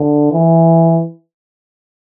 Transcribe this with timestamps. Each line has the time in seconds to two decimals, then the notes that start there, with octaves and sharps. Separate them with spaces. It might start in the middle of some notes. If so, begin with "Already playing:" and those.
Already playing: D3
0.31 E3